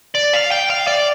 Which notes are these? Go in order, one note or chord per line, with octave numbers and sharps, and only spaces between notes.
D5
F5
G5
F5
D5